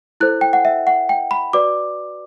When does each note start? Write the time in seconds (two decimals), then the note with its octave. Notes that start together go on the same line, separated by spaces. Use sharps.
0.20 E4 A4 C5 F#6
0.41 G5
0.53 F#5
0.65 E5
0.87 F#5
1.09 G5
1.31 B5
1.53 F#4 B4 D5 D6